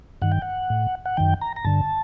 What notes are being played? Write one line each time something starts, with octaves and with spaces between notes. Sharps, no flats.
G2 D#3 F#5
G5
F#5
A2
F#5
F#2 D#3 G5
A#5
A#5
G2 D3 A5